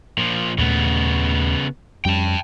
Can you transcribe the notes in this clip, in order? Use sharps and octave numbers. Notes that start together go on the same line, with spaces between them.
A#2 F3
D#2 A#2 C#3 A3 B3
F2 G3 C#4 G5 A5